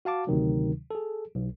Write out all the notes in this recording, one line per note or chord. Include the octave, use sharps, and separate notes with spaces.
F#4 F5 A5 D6
D2 C3 D#3 F#3
G#4 A4
B1